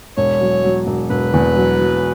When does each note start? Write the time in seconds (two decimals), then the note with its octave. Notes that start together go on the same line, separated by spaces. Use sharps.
0.17 E1 C#5
0.41 F#3
0.64 F#3
0.87 E1
1.10 E1 B4
1.33 E2
1.56 F#3
1.79 F#3